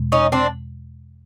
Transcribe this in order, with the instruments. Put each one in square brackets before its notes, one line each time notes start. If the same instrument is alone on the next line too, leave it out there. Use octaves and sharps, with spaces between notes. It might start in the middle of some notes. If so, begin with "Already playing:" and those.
Already playing: [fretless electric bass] E2 B2 G#3
[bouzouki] C#4 D#4
C4 D4